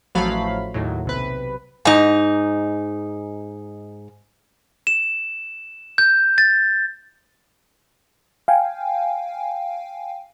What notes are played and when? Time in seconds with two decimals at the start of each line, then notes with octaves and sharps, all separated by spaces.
0.15 A1 F3 F#3 A3 F5 B5
0.74 D#2 A2 F#3
1.05 B1 C3 B4
1.85 G#2 D#4
4.87 E7
5.98 G6
6.38 A6
8.48 F5 G5 G#5